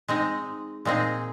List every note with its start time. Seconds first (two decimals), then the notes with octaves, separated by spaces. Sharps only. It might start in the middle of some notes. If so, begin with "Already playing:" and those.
0.08 G#3 C4 D#4
0.85 A#2 G#3 C4 D#4 G#4